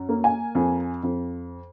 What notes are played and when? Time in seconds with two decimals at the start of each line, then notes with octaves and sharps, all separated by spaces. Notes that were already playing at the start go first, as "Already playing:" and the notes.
Already playing: F#2
0.09 A#3
0.24 G#5
0.55 F2
1.03 F2